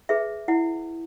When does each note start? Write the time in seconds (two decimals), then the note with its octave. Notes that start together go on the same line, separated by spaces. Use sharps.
0.09 G#4 B4 E5
0.48 E4 F#5